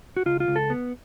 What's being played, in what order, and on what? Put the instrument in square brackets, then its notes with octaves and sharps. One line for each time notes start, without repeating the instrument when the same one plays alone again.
[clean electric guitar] F#4
C#2 F4
F4
C#2
A4
B3